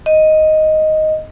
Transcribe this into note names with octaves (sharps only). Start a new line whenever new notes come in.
D#5